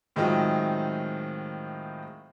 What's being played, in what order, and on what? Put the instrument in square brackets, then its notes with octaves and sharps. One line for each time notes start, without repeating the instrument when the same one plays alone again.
[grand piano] A2 D#3 F#3 G#3 C4 F4